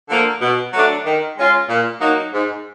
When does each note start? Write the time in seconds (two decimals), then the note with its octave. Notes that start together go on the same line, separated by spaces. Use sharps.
0.10 D3 F3 A#3
0.42 B2
0.73 F#3 A3 D4
1.06 D#3
1.38 G#3 C#4 F4
1.69 A#2
2.00 F#3 A#3 D#4
2.33 G#2